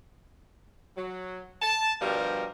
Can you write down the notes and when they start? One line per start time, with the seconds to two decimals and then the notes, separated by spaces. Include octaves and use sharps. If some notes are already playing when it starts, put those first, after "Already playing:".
0.97 F#3
1.62 A5
2.01 G2 B2 F3 G3 A#4